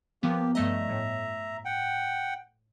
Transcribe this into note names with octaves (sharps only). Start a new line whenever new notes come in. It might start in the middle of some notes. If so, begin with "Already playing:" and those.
F3 A#3 B3 G4
G2 A3 D#5 E5 A#5
A2
F#5 G5